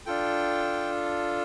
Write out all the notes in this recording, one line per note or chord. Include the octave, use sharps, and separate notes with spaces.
D4 F4 A4 G5